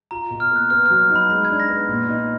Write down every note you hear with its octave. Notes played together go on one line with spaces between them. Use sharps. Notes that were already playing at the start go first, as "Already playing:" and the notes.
F4 A#5
B2
F6
A#3 F#6
B3 F6
F#3 F6
D#4
B5
G#3 B5
G#6
D4
A#6
B3
A#2
D#4